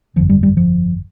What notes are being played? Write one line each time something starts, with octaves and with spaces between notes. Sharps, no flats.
G1 F2 D3 F3
G3
G3
F3